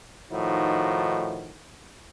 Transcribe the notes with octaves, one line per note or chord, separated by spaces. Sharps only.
A2 D#3 F3 D#4 F#4